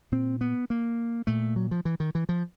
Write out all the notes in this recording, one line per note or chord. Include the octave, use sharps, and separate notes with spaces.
A#2 C4
B3
A#3
A#2 A3
F#3
F3
E3
D#3
E3
F3